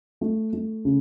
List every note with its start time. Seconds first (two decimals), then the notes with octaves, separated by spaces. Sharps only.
0.21 A3
0.53 A3
0.85 C#3